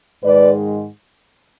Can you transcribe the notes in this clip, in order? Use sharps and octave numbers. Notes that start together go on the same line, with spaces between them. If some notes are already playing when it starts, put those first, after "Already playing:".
G#2 D#3 G#3 B4 D5